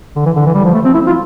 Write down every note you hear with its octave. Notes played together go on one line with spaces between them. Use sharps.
D3
E3
D3
E3
G3
F3
A3
C4
E4
F4